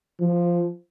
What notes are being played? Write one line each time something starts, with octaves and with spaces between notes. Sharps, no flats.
F3